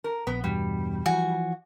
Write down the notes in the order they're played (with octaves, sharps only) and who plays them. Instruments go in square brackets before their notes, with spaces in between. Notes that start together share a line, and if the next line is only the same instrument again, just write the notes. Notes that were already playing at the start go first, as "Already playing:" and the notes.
[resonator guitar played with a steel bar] A#4
[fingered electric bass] A#1 [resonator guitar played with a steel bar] B3
[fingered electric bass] E2 G2 B2 [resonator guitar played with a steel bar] G3
[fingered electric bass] E3 F3 [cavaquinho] F#4 G#5